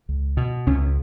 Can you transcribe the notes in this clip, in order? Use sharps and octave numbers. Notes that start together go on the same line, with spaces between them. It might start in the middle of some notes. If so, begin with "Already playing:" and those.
C#2
B2
C#2 C#4